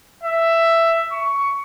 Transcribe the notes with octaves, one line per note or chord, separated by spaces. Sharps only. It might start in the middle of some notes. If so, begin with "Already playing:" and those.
E5
C#6